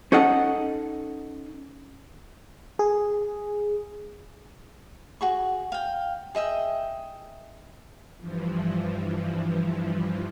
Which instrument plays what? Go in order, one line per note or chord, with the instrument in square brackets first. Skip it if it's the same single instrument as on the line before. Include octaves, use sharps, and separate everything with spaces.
[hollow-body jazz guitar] C#4 D#4 A4 D#5 F#5
[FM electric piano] G#4
[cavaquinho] F#4 G#4 C#6
F5 G5
G#4 D#5 E5 G5
[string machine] G2 E3 F3